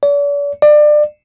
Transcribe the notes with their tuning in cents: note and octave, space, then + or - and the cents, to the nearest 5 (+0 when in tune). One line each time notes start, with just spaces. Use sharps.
D5 -45
D5 +25